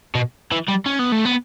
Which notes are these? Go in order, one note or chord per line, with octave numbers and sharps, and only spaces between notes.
B2
E3
G3
C#4
B3
A3
B3